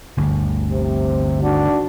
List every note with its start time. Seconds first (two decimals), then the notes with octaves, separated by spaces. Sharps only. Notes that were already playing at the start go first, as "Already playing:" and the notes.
0.17 G1 D2
0.70 C3
1.42 D#3 D4 F#4